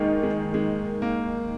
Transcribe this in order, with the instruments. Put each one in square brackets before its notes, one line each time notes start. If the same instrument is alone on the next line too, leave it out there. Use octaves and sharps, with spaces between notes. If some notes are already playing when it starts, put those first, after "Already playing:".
Already playing: [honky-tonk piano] D#3 A#3 D#4 [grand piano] G#3
[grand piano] G#3
G#3
A#3